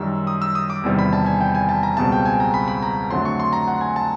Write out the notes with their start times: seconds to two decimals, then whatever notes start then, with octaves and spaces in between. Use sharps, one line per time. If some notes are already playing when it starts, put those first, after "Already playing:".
Already playing: F#2 D#3 G3 E6
0.27 D#6
0.42 E6
0.55 D#6
0.70 D6
0.84 E2 C3 D#3 G3
0.99 B5
1.13 A5
1.26 G#5
1.41 G5
1.55 G#5
1.69 A5
1.83 A#5
1.97 C#2 B2 G3 C4 A5
2.12 G5
2.25 G#5
2.40 A#5
2.54 B5
2.68 B5
2.82 A#5
3.10 F2 D3 F#3 A3 D4 C6
3.25 C#6
3.40 C6
3.53 A#5
3.68 F#5
3.81 G#5
3.96 A5